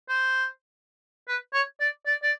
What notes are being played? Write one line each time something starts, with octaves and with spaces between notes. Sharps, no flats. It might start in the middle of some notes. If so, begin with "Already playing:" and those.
C5
B4
C#5
D5
D5
D5